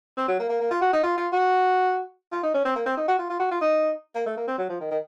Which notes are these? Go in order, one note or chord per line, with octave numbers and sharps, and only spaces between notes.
C4
F#3
A#3
A#3
A#3
F4
F#4
D#4
F4
F4
F#4
F4
D#4
C#4
C4
A#3
C4
D#4
F#4
F4
F4
F#4
F4
D#4
A#3
A3
A#3
C4
F#3
F3
D#3
D#3